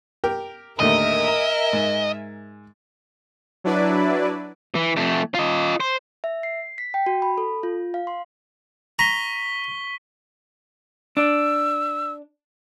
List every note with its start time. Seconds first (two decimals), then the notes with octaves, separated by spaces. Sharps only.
0.24 G4 A#4 G5
0.80 D#2 A2 D3 A#4 D#5 E5 G#5
1.28 A#5
1.73 G#2
3.64 F#3 D4 E4 B4 D5
4.75 E3
4.96 F2 A3
5.34 F4 D#5
5.80 C5
6.24 E5
6.43 C7
6.78 B6
6.94 G5
7.06 F#4
7.22 B5
7.38 A4
7.63 F4
7.94 F5
8.07 C6
8.99 A#5 C#6 B6 G7
11.17 D4 E6